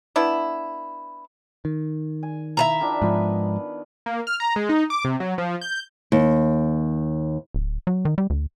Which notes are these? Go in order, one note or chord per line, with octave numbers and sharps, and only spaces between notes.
B3 D4 E4
D#3
G#5
E4 E5 A5 A#5
D#3 F3 D4
G#2 F3 B3 B4 G#5
A#3
F6
A#5
G#3
D#4
D6
C3
F#3
F3
G6
D#2
D1
F#3
D#3
G3
D2